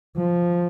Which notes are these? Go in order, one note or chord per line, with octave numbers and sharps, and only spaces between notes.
F3